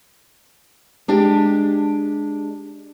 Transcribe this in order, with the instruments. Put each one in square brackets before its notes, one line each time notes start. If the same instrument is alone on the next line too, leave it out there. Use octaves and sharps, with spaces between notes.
[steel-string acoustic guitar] G#3 D4 G4